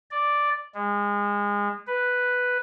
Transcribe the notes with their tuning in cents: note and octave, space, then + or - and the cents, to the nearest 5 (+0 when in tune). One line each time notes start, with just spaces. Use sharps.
D5 +0
G#3 -25
B4 +0